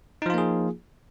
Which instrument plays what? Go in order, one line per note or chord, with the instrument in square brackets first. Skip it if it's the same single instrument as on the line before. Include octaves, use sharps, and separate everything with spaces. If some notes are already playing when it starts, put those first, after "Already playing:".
[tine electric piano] D#4
F3
F4
A#3
G#4